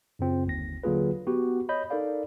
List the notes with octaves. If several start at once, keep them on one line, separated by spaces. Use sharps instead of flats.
F#2 C#3 C4 F4
G1 D#2 A#6
D3 F#3 A#3 F4 G#4 B4
B3 F#4 G4
C#5 D#5 B5 G6
D#4 A4 A#4 D5 F5